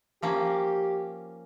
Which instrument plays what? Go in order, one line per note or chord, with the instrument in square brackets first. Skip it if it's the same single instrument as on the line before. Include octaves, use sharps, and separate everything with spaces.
[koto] F3 A#3 C#4 [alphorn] G4